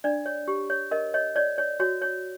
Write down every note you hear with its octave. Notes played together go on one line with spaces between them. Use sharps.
D4 D5
C#5
G4
C#5
A#4 D#5
C#5 D#5
C#5 D5
C#5
F#4 C#5
C#5